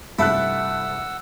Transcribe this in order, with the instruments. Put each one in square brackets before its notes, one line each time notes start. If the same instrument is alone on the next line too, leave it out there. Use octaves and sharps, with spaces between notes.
[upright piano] G2 C3 [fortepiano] A3 A4 F#6 [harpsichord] E4 [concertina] F#5 E6